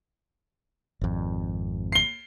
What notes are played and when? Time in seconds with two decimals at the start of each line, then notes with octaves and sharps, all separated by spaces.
1.01 G#1 F2
1.92 C7 G7